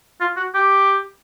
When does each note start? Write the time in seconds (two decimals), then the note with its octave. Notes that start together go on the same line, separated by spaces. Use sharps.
0.21 F4
0.37 F#4
0.54 G4